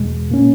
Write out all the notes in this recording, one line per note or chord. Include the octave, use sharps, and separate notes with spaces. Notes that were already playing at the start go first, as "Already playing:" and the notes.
Already playing: E2 B2 G#3
A#2 A#3 C#4